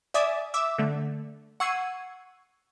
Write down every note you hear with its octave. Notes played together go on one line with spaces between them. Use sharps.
D5 E5 G#5 D6 D#6 A6
E5 D6 E6
D3 A3
F#5 C#6 E6 G#6 C7 D#7